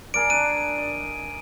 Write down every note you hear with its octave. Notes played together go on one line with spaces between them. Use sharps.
G#4 A#4 D5 D7
D4 D#7
D#5